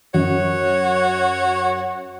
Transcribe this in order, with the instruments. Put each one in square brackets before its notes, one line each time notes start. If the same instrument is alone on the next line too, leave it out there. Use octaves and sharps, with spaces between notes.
[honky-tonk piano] F#2 [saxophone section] F#4 C#5